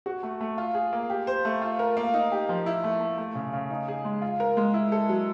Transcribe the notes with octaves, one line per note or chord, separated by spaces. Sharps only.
F#4
A3
A3
F4
G#4
A#3
G4
C5
A3
F4
A#4
A#3
D#4
G4
F3
E4
A3
A3
A3
C#3
C#3
D#4
G#4
G#3
F4
A#4
G#3
E4
A4
F#3